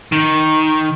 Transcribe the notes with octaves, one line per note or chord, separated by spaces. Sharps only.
D#3